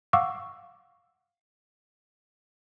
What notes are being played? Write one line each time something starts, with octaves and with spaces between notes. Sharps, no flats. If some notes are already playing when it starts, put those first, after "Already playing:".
F5 F#5 C#6 D6 E6